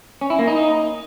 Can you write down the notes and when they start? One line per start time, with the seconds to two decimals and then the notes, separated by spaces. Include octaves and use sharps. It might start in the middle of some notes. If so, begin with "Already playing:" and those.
0.21 C#4
0.30 E4
0.39 A#3
0.47 D#4